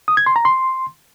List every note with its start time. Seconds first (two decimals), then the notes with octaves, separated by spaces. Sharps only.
0.08 D#6
0.17 G#6
0.26 C6
0.36 A#5
0.45 C6